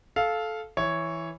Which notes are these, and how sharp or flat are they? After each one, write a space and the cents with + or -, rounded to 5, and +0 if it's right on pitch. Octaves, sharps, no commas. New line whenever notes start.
A4 -15 F5 +0
E3 +0 C#5 +0